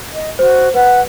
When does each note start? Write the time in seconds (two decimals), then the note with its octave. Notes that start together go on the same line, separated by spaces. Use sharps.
0.13 D#5
0.39 F#4 C5
0.74 B4 F#5